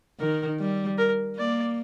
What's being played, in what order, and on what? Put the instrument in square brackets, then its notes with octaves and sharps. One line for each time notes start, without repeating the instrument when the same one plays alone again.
[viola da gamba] D#3 [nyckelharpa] A#4
[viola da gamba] G3
[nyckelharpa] A#4
[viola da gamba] A#3 [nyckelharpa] D5